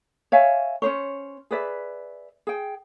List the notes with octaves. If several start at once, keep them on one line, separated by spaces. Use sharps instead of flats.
C#5 E5 F5 G#5
C#4 D4 C5 C#5
G#4 B4 D5 E5
G#4 G5